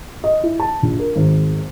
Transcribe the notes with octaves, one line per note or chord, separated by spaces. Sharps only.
D#5
E4
A5
A#1
A#4
G#1